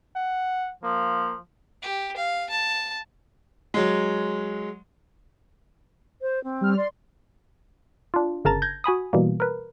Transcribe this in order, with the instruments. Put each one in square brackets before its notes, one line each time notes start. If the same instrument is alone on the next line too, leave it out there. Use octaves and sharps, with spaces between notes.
[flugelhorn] F#5
[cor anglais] F3 [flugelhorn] A#3
[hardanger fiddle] G4
F5
A5
[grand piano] F#3 G#3
[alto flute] C5
C4
[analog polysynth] G3 F6
[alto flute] D5 [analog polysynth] C6
[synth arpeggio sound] D4 F4
G1 C#3 A#4 A5 A#5 A6
G6 G#6 A#6
F#4 G#5 B5 D#6
B2 E3 G3 A#3
A#4 B4